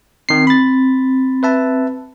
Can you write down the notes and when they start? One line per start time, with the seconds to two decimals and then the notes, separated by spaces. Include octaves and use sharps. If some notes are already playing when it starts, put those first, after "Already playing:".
0.29 D#3 C4 C7
0.47 B5 A6
1.43 B4 E5 A5